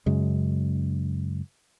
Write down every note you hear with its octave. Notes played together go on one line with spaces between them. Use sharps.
F#2 C#3 G#3